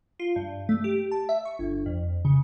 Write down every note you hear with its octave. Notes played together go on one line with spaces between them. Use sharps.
F4
G2
A3
G4
A5
E5
C#6
G1
F2
C#3